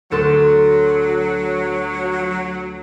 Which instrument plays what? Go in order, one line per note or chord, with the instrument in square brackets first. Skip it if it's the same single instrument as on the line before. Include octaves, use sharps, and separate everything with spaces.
[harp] D2 A4 C6 [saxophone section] F#3